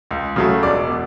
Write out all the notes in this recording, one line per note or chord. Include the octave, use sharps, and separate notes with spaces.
C#2
C#3 F#3 A3
E1 D5 D6
B2